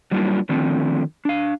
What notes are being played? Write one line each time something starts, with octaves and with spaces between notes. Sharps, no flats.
F#3 G3 A#3 D4 E4 F4
D3 D#3 F3 A3 C4 D4
D4 F5